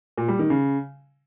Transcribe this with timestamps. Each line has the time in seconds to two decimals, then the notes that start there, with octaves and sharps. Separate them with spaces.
0.18 A#2
0.28 G3
0.39 D#3
0.50 C#3